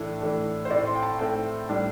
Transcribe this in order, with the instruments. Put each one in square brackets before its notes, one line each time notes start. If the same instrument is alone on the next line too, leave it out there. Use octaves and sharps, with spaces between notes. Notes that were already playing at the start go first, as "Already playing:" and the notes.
Already playing: [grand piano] A2 E3 A3 D4
A2 E3 A3 D4
C5
A2 A3 C4 D5
C6
G5
A5
A2 A3 C4 G5
A2 G3 D4